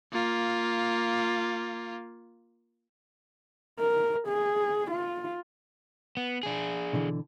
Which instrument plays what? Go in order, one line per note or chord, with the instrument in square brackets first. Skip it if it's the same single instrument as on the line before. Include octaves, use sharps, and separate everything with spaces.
[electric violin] A#3 F4
[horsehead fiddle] A#4
G#4
F4
[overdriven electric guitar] B3
D4 G#4
[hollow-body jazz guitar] B2 D3 E3